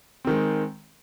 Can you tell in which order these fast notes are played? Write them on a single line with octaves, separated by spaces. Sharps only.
C4 D#3 G#3